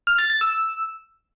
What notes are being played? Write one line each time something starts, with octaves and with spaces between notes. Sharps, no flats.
F6
A6
A6
E6